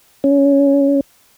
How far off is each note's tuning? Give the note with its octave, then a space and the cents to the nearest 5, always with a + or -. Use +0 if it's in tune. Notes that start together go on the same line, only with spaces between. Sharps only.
C#4 +15